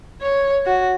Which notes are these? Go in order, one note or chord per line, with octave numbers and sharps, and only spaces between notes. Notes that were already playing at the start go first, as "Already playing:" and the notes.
C#5
F#4